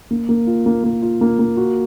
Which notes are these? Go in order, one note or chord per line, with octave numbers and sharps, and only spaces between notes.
A#3
A#3
F4
A#3
A#3
F4
A#3
A#3
F#4